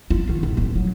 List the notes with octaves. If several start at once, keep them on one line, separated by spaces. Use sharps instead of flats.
F4
D#3
F#2
D1
F#3